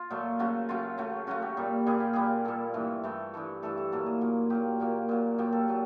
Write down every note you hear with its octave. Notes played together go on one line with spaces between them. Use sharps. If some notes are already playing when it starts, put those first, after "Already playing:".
Already playing: F4
A#2 F#3 A3
C#3 F#3 A3 F#4
C#3 F#3 A3 F4
C#3 F#3 A3
C#3 F#3 A3 F#4
G4
A#2 G3 A#3
A#2 G3 A#3 G#4
G4
A#2 G3 A#3 G#4
A#2 G3 A#3 A4
G2 E3 A3
G2 E3 A3
G2 E3 A3
G2 E3 A3 A4
A4
A#2 F#3 A#3 A4
G#4
A#2 F#3 A#3
A#2 F#3 A#3 G4
A#2 F#3 A#3
A#2 F#3 A#3
A#2 F#3 A#3 G4
A4
A#2 F#3